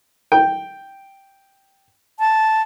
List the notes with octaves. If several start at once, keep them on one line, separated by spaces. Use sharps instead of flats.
G5
A5